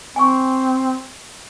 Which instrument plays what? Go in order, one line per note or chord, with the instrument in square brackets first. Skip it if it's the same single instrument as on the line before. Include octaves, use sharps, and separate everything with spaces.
[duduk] C4 [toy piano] G#5 C#6